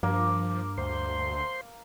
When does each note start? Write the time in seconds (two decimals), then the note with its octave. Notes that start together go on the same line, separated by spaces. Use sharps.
0.03 G2 F3 A#3
0.78 D2 C5 C6